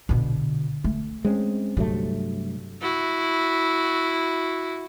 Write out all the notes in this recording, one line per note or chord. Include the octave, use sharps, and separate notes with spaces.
B2 D3
A3
G#3 C4 C#4
G2 C3 F#3 A3
E4 F#4